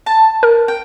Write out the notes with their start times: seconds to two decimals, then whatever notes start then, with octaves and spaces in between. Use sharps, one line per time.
0.06 A5
0.43 A#4
0.68 G5